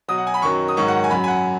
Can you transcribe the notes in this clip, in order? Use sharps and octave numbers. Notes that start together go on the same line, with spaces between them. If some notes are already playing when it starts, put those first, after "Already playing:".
B2 F#3 D#6
F#5
G#5
B5
F#2 D#3 F#3 C#6
D#6
G#2 D#3 F#3 C#6
F#5
G#5
F#2 F#3 B5
G#5
F#5